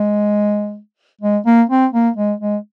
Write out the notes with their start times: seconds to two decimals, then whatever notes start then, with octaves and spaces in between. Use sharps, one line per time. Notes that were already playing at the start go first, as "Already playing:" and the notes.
Already playing: G#3
1.21 G#3
1.46 A#3
1.70 C4
1.93 A#3
2.16 G#3
2.40 G#3